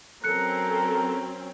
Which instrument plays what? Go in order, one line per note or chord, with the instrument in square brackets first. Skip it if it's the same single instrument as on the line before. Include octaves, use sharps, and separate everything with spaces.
[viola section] F#3 C4 C#4 [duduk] A4 [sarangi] A#4 [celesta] F#6 C#7